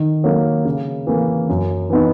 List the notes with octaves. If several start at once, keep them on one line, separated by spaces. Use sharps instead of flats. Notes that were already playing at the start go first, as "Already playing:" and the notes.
Already playing: D#3
F#3 A#3
C#3
E3 A#3
F#2
E3 B3 D#4